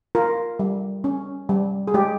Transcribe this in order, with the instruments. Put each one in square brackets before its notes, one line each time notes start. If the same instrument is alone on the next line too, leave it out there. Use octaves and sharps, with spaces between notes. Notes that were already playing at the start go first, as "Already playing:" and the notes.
[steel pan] F4 A#4
G3
C#4
G3
G#4
G#3 G4